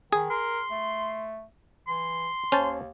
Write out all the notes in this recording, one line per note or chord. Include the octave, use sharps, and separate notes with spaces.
D#3 G#4
A#4 C6
A3
E3 C6
D#2 C#4 C5 A5